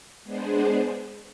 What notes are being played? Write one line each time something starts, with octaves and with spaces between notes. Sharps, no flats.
G#3 B3 D4 G#4 C5